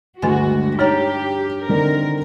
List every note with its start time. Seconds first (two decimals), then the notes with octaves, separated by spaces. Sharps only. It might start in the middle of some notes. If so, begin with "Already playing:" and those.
0.22 D2 G2 D#3 G#3 F#4 G#5
0.79 D#4 G4 C#5 A#5 F6
1.68 D3 D#3 C4 A#4